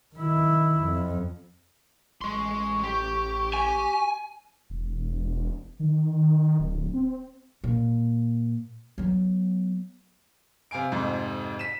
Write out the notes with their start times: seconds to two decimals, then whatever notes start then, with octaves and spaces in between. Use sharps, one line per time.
0.16 D#3 E4
0.84 F2
2.21 A1 G#3 C6 C#6
2.83 G4
3.54 G#5
4.70 E1
5.80 D#3
6.60 D1
6.94 C4
7.64 A#2
8.98 F#3 B3
10.71 C3 F5 G#5 D7
10.92 F2 G#2 C3
11.59 B6 D#7 E7